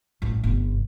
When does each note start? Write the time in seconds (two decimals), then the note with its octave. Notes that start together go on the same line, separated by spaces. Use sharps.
0.22 A1 A2
0.44 G1 C3